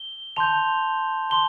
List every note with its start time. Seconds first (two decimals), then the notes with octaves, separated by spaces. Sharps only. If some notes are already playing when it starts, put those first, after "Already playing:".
Already playing: G7
0.36 A5 C6 G6 F7
1.30 A5 C6 G7